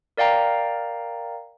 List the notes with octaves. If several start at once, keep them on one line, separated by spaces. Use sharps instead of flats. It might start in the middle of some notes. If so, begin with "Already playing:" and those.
A#4 D5 F5 G5 A#5